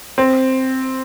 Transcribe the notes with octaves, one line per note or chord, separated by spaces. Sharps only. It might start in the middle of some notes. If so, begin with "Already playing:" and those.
C4